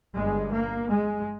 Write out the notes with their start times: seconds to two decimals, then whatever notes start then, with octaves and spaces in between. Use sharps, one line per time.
0.14 G1 G2 G#3
0.51 A#3
0.88 G#3